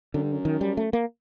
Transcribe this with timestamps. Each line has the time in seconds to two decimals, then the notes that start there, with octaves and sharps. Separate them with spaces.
0.14 F#2 D3
0.22 G2
0.32 F#2
0.45 D#3
0.61 G3
0.77 A3
0.93 A#3